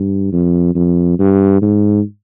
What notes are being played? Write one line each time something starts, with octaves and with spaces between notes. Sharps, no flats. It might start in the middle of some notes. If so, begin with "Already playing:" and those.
Already playing: G2
F2
F2
G2
G#2